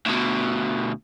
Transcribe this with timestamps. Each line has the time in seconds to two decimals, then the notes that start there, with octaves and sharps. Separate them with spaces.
0.06 D2 B2